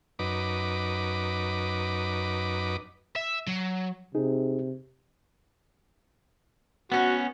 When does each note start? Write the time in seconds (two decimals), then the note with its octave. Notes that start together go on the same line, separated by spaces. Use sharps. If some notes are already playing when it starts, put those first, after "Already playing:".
0.19 F#2 D#4 B4 D6
3.16 E5
3.47 F#3
4.15 C3 D#4 G#4
6.92 B3 C#4 F#4